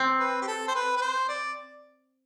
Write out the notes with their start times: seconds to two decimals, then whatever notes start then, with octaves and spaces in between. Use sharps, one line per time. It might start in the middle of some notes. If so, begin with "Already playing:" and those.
Already playing: C4
0.20 B4
0.42 G4
0.48 A4
0.68 C5
0.75 B4
0.97 B4
1.01 C5
1.29 D5